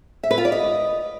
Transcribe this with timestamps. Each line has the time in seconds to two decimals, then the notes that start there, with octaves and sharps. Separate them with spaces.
0.23 E5
0.31 B4
0.38 F4
0.45 D5
0.52 D#5